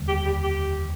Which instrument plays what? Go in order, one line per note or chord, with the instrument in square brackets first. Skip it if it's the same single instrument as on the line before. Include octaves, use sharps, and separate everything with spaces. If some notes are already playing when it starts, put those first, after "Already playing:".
Already playing: [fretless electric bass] F1 D#2 D3 G3
[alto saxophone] G4
G4
G4